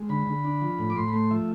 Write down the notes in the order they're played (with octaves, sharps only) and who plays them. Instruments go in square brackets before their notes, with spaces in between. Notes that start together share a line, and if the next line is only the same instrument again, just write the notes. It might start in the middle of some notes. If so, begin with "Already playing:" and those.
Already playing: [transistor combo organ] G#3
D3 B5
D3
D4
F3
A2
D6
A2 C6
B5
A3 C6
F3 E5